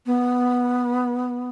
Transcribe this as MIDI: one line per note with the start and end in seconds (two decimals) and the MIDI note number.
0.06 1.50 59